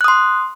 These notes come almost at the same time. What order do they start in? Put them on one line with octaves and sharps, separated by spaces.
F#6 D#6 C6